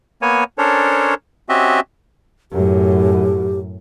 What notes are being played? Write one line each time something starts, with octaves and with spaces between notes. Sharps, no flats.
A#3 B3 C#5 G#5
C#4 D4 A4 A#4 C5 C#5
C4 C#4 F#4 G4 D#5 E5
F#2 A2 G4